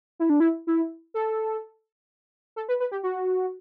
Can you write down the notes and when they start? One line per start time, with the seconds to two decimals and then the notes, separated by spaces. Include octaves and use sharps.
0.20 E4
0.30 D4
0.40 E4
0.67 E4
1.14 A4
2.56 A4
2.69 B4
2.80 B4
2.92 G4
3.03 F#4